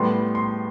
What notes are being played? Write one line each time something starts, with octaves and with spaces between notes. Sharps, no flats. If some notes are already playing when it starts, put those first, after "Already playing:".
Already playing: A2 G3 B3 C6
C6